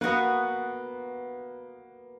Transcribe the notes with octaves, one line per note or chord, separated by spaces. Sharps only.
A#3 B3 F#4 B4 F#5